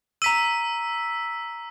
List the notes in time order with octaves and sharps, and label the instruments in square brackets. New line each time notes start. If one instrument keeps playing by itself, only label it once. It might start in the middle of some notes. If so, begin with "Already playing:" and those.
[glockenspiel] A#5 D#7 [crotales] E6 B6